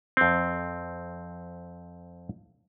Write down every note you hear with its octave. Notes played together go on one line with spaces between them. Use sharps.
F2 C4